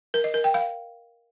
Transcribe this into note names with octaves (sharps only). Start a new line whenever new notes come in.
A#4
D#5
A#4
G5
F5